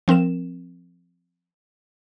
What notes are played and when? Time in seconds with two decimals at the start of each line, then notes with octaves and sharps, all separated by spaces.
0.08 F3 C4 A#4 E7